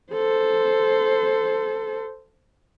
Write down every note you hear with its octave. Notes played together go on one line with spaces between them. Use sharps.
A4 C5